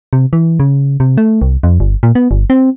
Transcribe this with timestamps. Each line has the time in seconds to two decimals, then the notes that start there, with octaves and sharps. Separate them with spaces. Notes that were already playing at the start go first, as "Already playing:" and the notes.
0.13 C3
0.33 E3
0.60 C#3
1.00 C3
1.18 A3
1.42 C2
1.63 F2
1.80 G1
2.03 A#2
2.15 B3
2.31 G1
2.50 C4